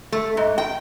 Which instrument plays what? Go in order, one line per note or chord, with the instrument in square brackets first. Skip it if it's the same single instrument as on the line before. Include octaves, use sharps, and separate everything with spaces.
[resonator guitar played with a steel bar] A3
G#2
G5